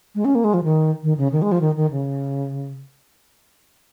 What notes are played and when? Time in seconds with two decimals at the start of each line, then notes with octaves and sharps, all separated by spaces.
0.15 G#3
0.25 C#4
0.35 A#3
0.44 G#3
0.54 F3
0.64 D#3
1.03 D#3
1.18 C#3
1.32 D#3
1.42 G#3
1.52 F3
1.61 D#3
1.76 D#3
1.91 C#3